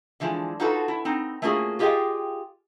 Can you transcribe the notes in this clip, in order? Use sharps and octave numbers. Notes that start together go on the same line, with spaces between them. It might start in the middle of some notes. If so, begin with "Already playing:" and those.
D3 E3 F3 G#3
D#4 F4 F#4 A4 B4
E4
C4 D#4
A3 A#3 C#4 F4 F#4 G#4
F4 G4 G#4 D#5 F5 G5